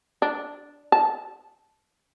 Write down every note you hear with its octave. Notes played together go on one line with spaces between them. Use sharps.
D4
A5